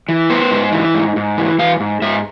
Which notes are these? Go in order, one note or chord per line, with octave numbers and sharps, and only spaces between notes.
E3
B3 C5
G#2
E3
G#2
G#2
E3
E3 F5
G#2
G#2 E5